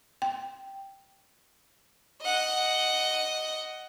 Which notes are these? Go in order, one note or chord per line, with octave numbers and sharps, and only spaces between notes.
G5
D#5 F#5